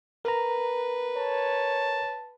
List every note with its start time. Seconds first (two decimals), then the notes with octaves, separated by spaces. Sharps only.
0.25 A#4 B4 A#5
1.17 C#5 A5